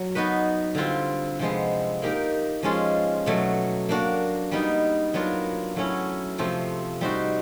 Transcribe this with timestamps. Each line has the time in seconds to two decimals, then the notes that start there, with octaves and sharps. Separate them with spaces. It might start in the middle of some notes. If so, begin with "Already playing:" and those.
Already playing: F#3
0.15 B3 D#4 F#4 B4
0.75 D3 G3 C4 F4
1.39 C3 F3 G#3 B3
2.02 A#3 D#4 G4 A#4
2.63 F3 G#3 C#4 F4
3.26 B2 F#3 A3
3.89 A#3 D4 F#4
4.51 G3 B3 D#4
5.14 F#3 B3 D4 F4 A#4
5.76 F#3 A3 C#4 E4
6.38 C3 F3 A3 C4
7.01 G3 C4 D#4 F#4